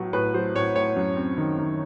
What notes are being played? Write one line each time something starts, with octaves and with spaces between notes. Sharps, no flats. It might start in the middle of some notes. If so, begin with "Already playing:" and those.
Already playing: A2 F#3 B3
A2 B4
F#3 C5
A2 C#5
A2 C#5
F#2
C4
D#3
D#3